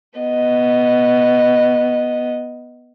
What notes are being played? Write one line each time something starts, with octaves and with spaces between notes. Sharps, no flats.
B3 D#5